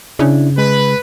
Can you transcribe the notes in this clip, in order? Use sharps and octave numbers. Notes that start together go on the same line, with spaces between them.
C#3 D4 E4
G#3 B4